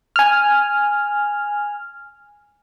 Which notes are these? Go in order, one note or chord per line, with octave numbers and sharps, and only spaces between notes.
G#5 F6